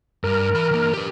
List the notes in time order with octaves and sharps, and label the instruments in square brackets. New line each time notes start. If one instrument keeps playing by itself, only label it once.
[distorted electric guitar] G2 [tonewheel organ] A#4
[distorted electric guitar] E3 B5
E3 A#3
G4 B4